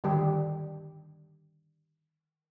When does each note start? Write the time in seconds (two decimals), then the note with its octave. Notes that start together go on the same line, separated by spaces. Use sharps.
0.04 D3 D#3 G3 D4 G4